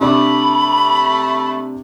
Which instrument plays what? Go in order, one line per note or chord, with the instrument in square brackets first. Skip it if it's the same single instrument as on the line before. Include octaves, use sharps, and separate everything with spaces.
[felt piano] C3 D4 D6 [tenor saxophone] A3 [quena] B5